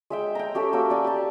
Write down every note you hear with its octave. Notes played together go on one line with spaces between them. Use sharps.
G#3 E5 G5
G5 A#5
C#4 G4 A4 E5
A#3 F#4 E6
D5 G5 G#5
G4 A5